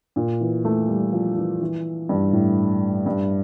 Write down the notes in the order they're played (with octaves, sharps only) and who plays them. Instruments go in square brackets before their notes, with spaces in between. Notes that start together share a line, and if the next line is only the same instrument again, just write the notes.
[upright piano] A#2
E3
A3
G3
F3
E3
E3
G2
A2
G2